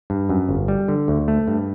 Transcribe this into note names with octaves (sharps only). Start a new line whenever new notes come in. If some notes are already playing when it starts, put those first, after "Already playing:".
G2
F#2
G1
G3
D3
D2
A3
G2